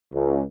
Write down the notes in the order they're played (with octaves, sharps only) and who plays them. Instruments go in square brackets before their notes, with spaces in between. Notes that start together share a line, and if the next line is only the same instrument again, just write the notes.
[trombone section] C#2